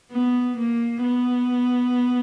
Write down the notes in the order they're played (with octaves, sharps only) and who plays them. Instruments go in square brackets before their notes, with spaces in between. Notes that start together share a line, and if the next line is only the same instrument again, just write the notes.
[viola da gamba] B3
A#3
B3